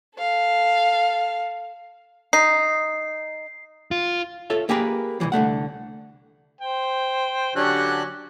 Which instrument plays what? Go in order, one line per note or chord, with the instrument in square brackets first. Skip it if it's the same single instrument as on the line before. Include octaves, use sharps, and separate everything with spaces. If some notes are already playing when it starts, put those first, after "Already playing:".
[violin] A4 F5
[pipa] D#4 [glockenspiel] C7
[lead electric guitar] F4
[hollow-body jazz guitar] F4 A4 C#5 E5
A#3 G4 G#4 A#4 B4
C2 F#2 E3 F3
C2 D3 A3 F#5
[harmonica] C5 G5
[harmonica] D3 F#3 C#4 [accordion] D4 G4 F#6